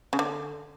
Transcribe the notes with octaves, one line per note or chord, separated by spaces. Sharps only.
C#3
D3